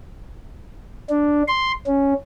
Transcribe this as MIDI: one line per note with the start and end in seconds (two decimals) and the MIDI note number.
1.10 1.43 62
1.48 1.72 84
1.86 2.13 61